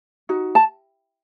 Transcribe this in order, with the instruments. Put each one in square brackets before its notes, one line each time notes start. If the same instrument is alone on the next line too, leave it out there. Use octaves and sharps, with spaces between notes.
[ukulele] D#4 F#4
A5